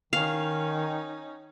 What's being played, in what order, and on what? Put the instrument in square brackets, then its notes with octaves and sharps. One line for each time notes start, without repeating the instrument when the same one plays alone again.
[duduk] D#3 [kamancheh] C#4 D#4 [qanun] F5